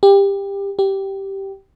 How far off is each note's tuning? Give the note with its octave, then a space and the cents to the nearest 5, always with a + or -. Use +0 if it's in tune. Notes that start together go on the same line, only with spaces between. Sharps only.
G4 +20
G4 -10